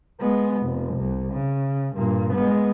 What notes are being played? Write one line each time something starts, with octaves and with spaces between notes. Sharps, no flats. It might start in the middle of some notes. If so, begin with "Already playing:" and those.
G#3 B3
F1
C2
C#3
G2 A#2
G#3 B3